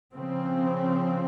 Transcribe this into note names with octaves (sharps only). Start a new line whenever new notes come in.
C#3 F3 C4